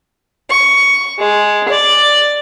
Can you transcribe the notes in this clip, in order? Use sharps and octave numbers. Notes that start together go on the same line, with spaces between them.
C#6
G#3
D5